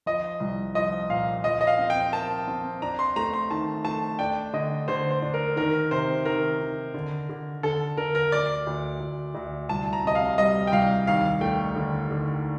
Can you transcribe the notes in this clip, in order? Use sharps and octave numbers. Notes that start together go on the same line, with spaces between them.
F3 D#5
C2
F3 D#5
A#2 F5
F3 D#5
D#5
F5
C4
G5
A#4 A5
C4
D4 A#5
C6
A3 A#5
C6
D#3 A5
A3 A5
D4 G5
D3 D#5
D3 C5
C5
D4
A#4
D#3 A#4
C3 C5
D#3 A#4
D#3
D3
D3
D3 A4
D3 A#4
A#4
D2 D5
D2
D2
D2
C2 A5
A#5
C3 D#5
F5
G3 D#5
G5
C2 F5
D#2 F5
A3 G5
D3
D3